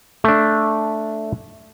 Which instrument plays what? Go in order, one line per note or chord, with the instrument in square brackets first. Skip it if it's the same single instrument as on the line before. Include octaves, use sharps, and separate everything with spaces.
[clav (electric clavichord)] A3 D4